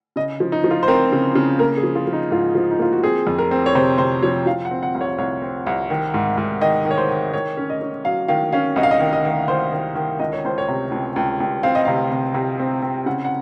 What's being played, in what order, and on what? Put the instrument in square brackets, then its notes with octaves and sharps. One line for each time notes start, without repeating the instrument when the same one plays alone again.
[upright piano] C#3 D#5
F3
D#4
F3
F4
C5
C4 A#4
C#3
C#3
A#3 A#4
G#4
F3
F4
F3
D#4
G#2 F4
F3
D#4
A#3 F4
F#4
C4 G#4
F2
A#4
C4
C#5
C3 C5
C3 C5
F3 C#5
F3 F5
F#5
C4
F#5
C2
C#5
C2 C#5
C4
C2
D#3
G#2
G#2
D#3 D#5
D#3
C#5
C5
D#3
D#3 C#5
C#4
D#5
C#4
F#3 F5
D#3 F5
C#4 F5
C2 D#5
F5
D#5
D#3
D#5
D#3
D#3 C5
D#3
D#3
C#2 D#5
C#5
C#2 C5
C#5
C3
C#2
C#2
C#2
C4 F5
D#5
C3 F5
C3
C3
C4
C4
C#3 F#5
F#5